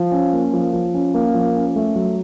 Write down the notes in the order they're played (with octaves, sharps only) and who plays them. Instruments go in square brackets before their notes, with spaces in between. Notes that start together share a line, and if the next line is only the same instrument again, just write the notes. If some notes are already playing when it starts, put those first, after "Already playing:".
Already playing: [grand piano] F3
C#4
A#3
F3
F3
C#4
A#3
F3
C#4
A3
F#3